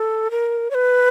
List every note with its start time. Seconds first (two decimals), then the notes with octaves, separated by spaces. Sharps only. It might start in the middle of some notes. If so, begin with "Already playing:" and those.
Already playing: A4
0.31 A#4
0.71 C#5
0.75 B4